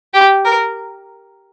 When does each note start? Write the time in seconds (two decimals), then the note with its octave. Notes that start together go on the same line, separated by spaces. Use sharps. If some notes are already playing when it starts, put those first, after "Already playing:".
0.14 G4
0.45 A#4